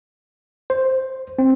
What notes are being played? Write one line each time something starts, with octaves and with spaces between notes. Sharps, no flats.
C5
C4